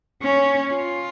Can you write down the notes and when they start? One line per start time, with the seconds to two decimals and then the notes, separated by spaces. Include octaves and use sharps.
0.22 C#4
0.75 F4